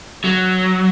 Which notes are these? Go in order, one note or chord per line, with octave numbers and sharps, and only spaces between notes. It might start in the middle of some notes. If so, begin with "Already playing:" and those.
F#3